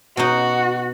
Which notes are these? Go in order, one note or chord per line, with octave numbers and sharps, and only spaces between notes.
B2 D#4 F#4